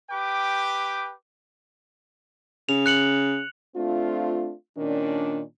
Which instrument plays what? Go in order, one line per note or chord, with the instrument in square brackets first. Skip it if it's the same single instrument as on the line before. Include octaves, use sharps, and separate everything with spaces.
[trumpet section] G4 B4 G5 D6
[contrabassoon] C#3 [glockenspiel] F7
[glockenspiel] F#6 C#7 F#7
[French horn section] A3 C4 D4 F4
A#2 D#3 C#4 D4